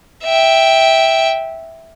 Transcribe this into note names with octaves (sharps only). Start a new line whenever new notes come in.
E5 G5